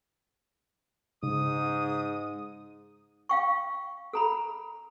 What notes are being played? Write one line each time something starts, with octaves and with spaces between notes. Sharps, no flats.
G#2 C#3 D#6
F5 G5 C#6
A4 A#5 B5